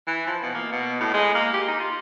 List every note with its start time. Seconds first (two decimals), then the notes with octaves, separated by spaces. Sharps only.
0.07 E3
0.27 F3
0.42 B2
0.55 A#3
0.72 B2
1.00 A2
1.14 G#3
1.35 A#3
1.53 G4
1.68 D#4
1.80 F4